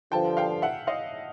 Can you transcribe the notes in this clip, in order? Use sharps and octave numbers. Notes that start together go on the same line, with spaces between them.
G2 D3 F3 G5 A5
F5 G5
E5 F#5
D#5 F5